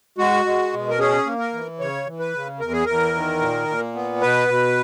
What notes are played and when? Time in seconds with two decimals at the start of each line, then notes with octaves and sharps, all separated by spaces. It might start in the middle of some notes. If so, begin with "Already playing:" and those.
0.18 G#3 F#4
0.45 G#3
0.73 B2
0.89 A#4
0.99 C#4 G#4
1.26 A#3
1.39 A#4
1.53 E3
1.80 C#3 C#5
2.06 E3
2.20 B4
2.34 C#3
2.60 E2 A#4
2.72 G#4
2.85 E2 A#4
3.14 D#3
3.41 A#2
3.68 A#2
3.95 B3
4.21 B2 B4
4.48 B2